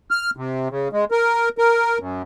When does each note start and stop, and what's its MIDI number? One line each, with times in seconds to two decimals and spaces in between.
0.11 0.30 89
0.37 0.68 48
0.70 0.88 49
0.93 1.05 56
1.11 1.49 70
1.58 1.98 70
1.99 2.22 42